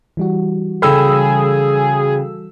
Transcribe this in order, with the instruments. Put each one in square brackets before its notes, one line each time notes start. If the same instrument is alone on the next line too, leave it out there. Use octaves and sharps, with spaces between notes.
[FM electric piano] E3 G3 F#4
[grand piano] C#3 G5 B5 [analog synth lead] G#4 [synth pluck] A4 E6